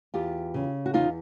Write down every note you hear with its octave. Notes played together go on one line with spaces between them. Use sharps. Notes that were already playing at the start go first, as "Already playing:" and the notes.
E2 F4 G4
C#3
F#4
E2 D#4 F4